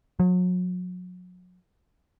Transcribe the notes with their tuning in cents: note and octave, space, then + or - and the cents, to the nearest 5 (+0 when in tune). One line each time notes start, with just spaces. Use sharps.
F#3 -35